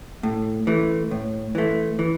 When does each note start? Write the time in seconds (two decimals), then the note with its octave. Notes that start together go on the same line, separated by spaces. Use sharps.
0.23 A2
0.67 E3 A3
1.11 A2
1.55 E3 A3
1.99 E3